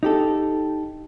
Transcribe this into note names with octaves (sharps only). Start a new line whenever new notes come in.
D#4 G4 A4